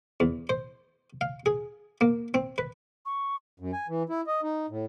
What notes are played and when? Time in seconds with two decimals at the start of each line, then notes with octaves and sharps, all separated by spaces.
0.20 E2
0.49 C5
1.21 F5
1.46 G#4
2.01 A#3
2.34 C4
2.58 B4
3.06 C#6
3.60 F#2
3.73 G#5
3.88 E3
4.09 E4
4.27 D#5
4.43 D#4
4.69 A2